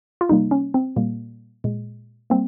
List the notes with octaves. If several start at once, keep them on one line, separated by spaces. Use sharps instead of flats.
F4
C3 G3 A#3 D#4
C#4
C4
A#2 G3 A#3
A#2 G#3
G3 A#3 C4